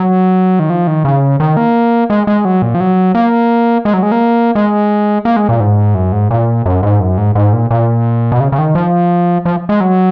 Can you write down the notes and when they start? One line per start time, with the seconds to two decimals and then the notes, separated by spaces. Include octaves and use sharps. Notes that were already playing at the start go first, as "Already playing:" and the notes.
Already playing: F#3
0.59 D#3
0.70 F3
0.87 D#3
1.05 C#3
1.40 D#3
1.57 A#3
2.10 G#3
2.27 G#3
2.45 F#3
2.62 A#2
2.75 F3
2.80 F#3
3.15 A#3
3.85 G#3
3.94 F#3
4.03 G#3
4.12 A#3
4.55 G#3
5.25 A#3
5.36 G#3
5.49 A#2
5.60 G#2
5.95 F#2
6.12 G#2
6.31 A#2
6.66 F#2
6.83 G#2
7.00 F#2
7.18 G#2
7.35 G#2
7.53 A#2
7.71 A#2
8.32 B2
8.40 C#3
8.52 C#3
8.58 D#3
8.75 F3
9.45 F3
9.69 G#3
9.81 F#3